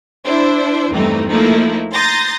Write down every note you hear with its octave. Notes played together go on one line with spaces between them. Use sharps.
D4 E4 C5
E2 G2 E3 A3 C4 D#4
F3 A3 A#3 D#4 E4
A#5 C6 D#6 G6 A6 A#6